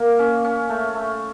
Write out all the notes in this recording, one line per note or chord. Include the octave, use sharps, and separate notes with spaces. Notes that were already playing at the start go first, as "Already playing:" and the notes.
Already playing: A#3
C#4
C#4
A3
A3